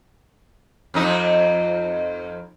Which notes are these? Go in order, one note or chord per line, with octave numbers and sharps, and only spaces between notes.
F2 C4 D#4